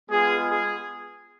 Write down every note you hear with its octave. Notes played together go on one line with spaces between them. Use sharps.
G#3 B3 F4 G#4
G#4